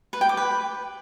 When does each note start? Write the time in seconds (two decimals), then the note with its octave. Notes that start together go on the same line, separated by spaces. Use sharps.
0.13 B4
0.21 G5
0.29 D6
0.37 B4